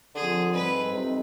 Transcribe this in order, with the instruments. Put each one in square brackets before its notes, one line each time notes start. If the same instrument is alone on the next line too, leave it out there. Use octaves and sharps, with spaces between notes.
[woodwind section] D3 F3 C4 F4 [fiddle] G#4
[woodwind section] G#2 G3 C4 [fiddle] B4
[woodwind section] F2 C3 G3 C4 D#4